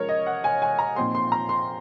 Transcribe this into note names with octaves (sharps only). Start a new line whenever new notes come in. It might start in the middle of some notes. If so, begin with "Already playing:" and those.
Already playing: F3 G#3 C#4 A#4 C#5
D#5
F#5
G#5
G#5
A#5
A#2 F3 C4 D#4 C6
C6
A#5
C6